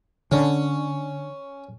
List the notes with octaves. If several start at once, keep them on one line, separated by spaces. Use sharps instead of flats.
D3 C#4